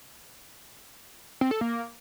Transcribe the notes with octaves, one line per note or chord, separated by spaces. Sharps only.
C4
A4
A#3